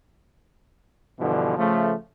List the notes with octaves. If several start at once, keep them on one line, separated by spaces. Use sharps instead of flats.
G2 B2 D3 E3 F3
C#3 F3 A3